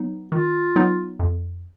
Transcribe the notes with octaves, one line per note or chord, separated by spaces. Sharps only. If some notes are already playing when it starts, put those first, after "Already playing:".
Already playing: F#3 B3 D#4
D#3 F4
F#3 B3 D#4
F2